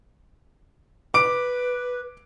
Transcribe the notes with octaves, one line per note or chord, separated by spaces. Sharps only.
B4 D6 D7